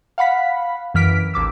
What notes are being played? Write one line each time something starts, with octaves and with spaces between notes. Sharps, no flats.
F5 F#5 B5 B6
F#2 E3 F6 B6 D7
A1 D#2 D6 E6